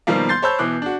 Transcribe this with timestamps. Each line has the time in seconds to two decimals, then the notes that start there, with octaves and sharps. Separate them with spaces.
0.07 B2 D#3 F3 G3 A#3
0.29 C6 G6 A6 C7
0.42 C5 C#5 A5 B5 E6 G6
0.59 B2 E3 D6 F#6
0.82 D4 F#4